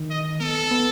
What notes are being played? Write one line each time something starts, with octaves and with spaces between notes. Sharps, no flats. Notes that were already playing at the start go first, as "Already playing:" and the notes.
Already playing: D#3
D#5
B3 A4
B3